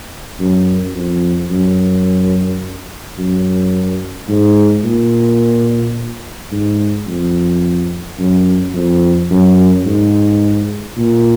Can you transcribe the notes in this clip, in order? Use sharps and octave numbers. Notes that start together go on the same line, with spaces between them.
F#2
F2
F#2
F#2
G#2
A#2
G#2
F2
F#2
F2
F#2
G#2
A#2